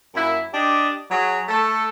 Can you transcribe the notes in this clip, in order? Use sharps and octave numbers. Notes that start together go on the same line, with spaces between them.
F#2 A#3 E4
D4 G4 D5 D#5
F#3 G#4
A3 A4